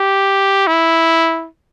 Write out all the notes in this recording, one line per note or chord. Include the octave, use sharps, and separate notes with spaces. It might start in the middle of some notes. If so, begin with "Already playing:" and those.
Already playing: G4
E4